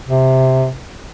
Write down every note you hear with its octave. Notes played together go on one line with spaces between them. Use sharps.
C3